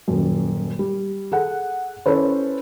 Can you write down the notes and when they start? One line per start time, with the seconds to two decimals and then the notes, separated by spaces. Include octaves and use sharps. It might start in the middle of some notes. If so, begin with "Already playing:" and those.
0.08 D#1 F#2
0.79 G3
1.32 G#4 A4 F#5
2.06 C#4 E4 A4 B4 C5